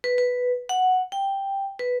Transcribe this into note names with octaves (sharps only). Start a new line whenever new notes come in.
B4
B4
F#5
G5
B4